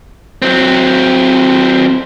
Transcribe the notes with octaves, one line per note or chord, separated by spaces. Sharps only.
F#3 C4